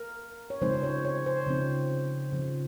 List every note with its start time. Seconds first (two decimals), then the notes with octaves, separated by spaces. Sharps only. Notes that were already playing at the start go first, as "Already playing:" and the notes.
Already playing: A#4
0.50 C#5
0.62 C#3 F3 G#3 C4 D#4 C5
0.83 C#5
1.05 C#5
1.26 C5
1.47 C#3 F3 C4 D#4
2.33 C#3 F3 C4